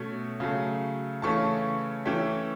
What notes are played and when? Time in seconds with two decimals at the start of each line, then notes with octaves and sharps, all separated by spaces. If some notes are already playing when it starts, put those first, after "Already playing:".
Already playing: B2 A3 C#4
0.40 C#3 F#3 A3
1.22 C#3 E3 A3 C#4 A5 C#6
2.05 E3 A3 C#4 E5 G5